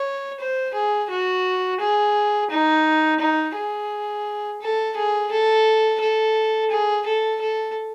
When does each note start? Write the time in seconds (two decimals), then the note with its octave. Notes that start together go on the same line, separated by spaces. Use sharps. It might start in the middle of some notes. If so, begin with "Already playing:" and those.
Already playing: C#5
0.40 C5
0.73 G#4
1.10 F#4
1.80 G#4
2.50 D#4
3.20 D#4
3.55 G#4
4.61 A4
4.96 G#4
5.31 A4
6.00 A4
6.71 G#4
7.06 A4
7.41 A4